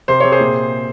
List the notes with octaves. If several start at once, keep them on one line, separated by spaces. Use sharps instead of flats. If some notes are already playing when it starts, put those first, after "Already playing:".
C3 C5
C3 C#5
G#4 C5
A#2